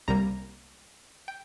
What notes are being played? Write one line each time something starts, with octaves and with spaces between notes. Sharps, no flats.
C2 C3 G3 A#3 A#5
G5